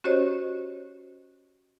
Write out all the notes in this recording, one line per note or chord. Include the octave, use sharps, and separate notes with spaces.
C#4 F#4 G4 C5 C#5 D#5